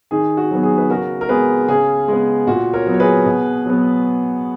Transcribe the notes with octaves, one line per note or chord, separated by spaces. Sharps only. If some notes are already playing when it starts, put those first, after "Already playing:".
D#3 G#4
F#4
F#3 B3
G#4
B4
C#3 F#4 A#4
A#4
G#3 B3 G#4 B4
C#3 G#4
G#3 B3
A#2 F#4
A#4 C#5
F#3 B3
C#5
G#4 B4
B2
F#3 B3